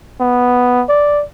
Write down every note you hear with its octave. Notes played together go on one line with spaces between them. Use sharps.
B3
D5